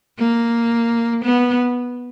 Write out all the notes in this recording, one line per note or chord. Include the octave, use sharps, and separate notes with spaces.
A#3
B3